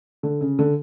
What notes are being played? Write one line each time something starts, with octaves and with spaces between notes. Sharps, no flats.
D3
C#3
D3